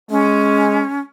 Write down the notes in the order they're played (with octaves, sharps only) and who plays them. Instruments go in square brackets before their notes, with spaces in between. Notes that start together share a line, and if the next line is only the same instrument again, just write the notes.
[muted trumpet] G#3 [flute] C#4